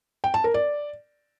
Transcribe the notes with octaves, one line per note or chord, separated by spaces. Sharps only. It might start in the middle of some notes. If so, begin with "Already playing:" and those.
G5
A5
A#4
D5